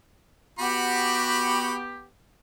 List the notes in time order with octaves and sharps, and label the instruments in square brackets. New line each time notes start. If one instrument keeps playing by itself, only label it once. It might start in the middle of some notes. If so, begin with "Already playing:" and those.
[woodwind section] B3 G4 [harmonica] F#4 B5 C#6